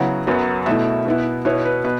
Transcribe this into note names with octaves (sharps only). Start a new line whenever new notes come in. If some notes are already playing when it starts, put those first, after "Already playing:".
Already playing: C#3 F#3 B3 E4 F#5
F#2 F#3 B3
B2 A3 E4 E5
B2 B3 E4
B2 B3 E4 C#5
B4
B2 B4